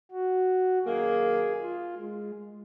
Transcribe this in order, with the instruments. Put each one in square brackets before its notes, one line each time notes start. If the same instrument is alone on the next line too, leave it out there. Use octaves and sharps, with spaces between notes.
[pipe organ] F#4
[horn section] F#2 D#3 A#3 [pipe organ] G#4
[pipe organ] F4
G#3